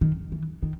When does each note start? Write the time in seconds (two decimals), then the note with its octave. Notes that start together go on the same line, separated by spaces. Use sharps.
0.01 D#3
0.32 E3
0.62 D#3